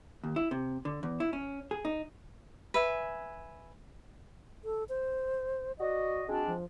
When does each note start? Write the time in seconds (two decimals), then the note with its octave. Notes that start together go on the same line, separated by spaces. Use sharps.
0.24 D#2
0.36 E4
0.51 C3
0.85 D3
1.03 E2
1.20 E4
1.33 C#4
1.71 G#4
1.85 D#4
2.74 B4 E5 G#5
4.64 A4
4.89 C5
5.80 F#4 D5 D#5
6.29 G#3 C4 D4 F#4
6.47 F3